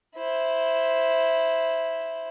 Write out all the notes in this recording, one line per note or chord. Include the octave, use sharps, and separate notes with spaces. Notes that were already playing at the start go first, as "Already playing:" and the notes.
E4 C5